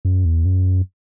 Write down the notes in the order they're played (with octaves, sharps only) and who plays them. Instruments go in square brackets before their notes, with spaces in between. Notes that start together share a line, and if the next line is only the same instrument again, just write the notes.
[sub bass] F#2
E2
F#2